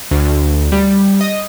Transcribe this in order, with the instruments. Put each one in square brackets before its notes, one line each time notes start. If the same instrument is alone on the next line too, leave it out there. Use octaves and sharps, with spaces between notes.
[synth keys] D2
G3
D#5